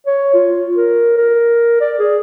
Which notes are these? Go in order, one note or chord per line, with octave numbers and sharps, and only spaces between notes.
C#5
F4
A#4
A#4
D5
G#4